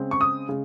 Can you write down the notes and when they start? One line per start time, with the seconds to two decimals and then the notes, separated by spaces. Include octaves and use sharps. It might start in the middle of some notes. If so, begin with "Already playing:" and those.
Already playing: C#3 G#3 C4
0.11 C#6
0.21 D#6
0.49 C#3 G#3